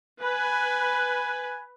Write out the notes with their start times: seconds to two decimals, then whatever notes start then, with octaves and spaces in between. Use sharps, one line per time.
0.22 B4 G#5